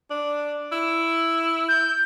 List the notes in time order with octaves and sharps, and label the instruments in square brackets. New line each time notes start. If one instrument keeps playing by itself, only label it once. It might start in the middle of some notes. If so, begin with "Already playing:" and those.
[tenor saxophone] D4
E4
[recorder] G6